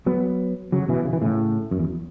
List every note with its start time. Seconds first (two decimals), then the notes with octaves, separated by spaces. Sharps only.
0.06 F#3 B3
0.72 C#3 F#3
0.88 B2 E3
1.05 C#3
1.13 E3
1.21 A2 C#3
1.71 F#2
1.79 E2